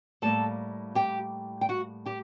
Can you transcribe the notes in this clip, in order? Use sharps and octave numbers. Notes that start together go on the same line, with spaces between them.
A2 G3 A#3 A4 A5
G4 G5
G5
F#4 F#5
G4 G5